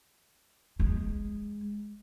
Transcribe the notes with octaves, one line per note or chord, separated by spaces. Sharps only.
G#3